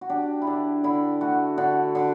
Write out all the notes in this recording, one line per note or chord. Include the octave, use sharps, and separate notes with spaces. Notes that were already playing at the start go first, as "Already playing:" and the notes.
F#4
D4 G4
E4
D3 D4
D3 E4
A3 F#4
D3 F#4
D3